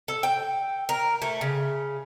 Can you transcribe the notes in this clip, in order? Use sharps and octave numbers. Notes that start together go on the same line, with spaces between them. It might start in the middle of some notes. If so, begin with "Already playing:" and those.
A4
G5
A#4
A3
C#3